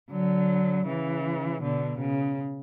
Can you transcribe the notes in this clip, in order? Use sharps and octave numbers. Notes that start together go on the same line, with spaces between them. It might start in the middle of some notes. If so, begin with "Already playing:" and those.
D3 F#3
C#3 E3
B2 D3
C#3